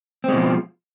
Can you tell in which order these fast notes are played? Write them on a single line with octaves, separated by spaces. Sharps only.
C4 G#3 B2 F3